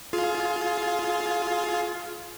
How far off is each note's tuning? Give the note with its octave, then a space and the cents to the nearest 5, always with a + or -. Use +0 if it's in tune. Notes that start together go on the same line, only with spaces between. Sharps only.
F4 +0 G#4 +30